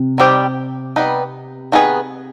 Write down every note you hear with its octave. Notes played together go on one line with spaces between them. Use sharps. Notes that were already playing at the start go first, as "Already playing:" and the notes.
Already playing: C3
D#3 G3 C4 G4 D5
G3 B3 D#4 B4
D#3 B3 D#4 G#4 B4